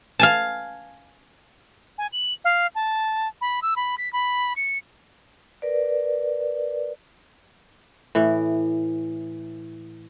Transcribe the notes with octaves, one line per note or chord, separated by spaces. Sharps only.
F5 G#5 A5
G#5
F#7
F5
A5
B5
E6
B5
B6
B5
C#7
A#4 B4 D5
A2 E3